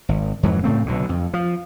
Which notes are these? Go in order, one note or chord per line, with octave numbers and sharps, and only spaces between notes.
G#1
F2 G#2 E3 F#3
A2 C#3 A3 C4
B1 B2 D3
F2
F3